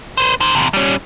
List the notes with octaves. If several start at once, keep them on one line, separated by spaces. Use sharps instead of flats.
B4 C5
D#3 C5
E2 C3
G3 C#4